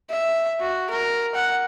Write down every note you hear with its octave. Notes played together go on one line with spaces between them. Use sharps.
E5
F#4
A#4
F#5